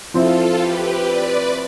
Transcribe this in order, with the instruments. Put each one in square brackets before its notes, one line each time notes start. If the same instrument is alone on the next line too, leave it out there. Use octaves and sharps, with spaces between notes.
[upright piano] F3 C4 E4 [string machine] F4 A4
[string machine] G4 B4
B4 D5